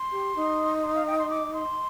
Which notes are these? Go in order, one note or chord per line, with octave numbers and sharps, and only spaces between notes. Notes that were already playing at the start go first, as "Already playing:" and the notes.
Already playing: C6
G4
D#4
C6
F5
G5
C6
D6
C6